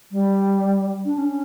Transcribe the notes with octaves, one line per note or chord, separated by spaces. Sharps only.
G3
D4
C#4